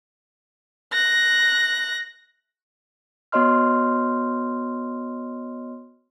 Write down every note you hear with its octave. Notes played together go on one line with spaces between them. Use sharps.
F#6 A#6
B3 F#4 C#5 D#5 C6 F6